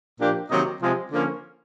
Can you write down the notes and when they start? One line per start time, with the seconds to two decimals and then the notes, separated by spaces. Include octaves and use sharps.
0.20 A#2 F3 A#3 D4 G4
0.50 C3 D#3 F#3 A#3 D#4
0.81 C3 F3 G#3
1.12 D3 F3 A#3 C#4